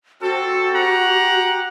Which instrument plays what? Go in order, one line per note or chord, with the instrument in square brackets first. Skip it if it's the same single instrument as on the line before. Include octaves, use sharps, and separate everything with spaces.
[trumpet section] C4 A4 [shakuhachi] F#4
[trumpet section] G4 F#5 A#5